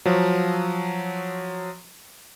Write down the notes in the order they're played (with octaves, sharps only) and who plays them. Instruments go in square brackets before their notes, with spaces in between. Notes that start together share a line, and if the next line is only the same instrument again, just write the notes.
[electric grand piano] F3 F#3